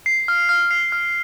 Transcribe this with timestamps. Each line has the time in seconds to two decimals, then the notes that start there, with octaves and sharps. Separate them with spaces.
0.06 C7
0.28 F6
0.49 F6
0.71 C7
0.92 F6